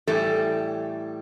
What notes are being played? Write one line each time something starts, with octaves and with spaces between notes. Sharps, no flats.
A2 E3 G3 A4